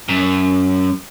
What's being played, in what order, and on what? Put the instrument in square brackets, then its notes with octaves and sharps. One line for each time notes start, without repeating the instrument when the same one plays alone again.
[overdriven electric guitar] F#2